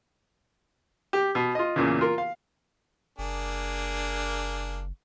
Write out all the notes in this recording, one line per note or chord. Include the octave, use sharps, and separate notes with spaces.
G4
B2
F4 D#5
E2 A#2 C#3
F4 A#4
F5
F#1 A#3 D4 G#4